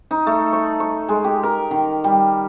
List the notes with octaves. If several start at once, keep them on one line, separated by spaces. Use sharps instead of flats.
D#4
A3
C#6
C#6
G#3
G4
A#4
D#3
G3